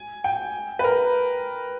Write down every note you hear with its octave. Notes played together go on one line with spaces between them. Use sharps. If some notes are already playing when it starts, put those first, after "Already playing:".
Already playing: G#5
G5
B4
A#4